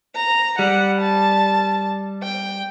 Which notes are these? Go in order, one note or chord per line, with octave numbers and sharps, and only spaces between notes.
A#5
G3 F#5
A5
G5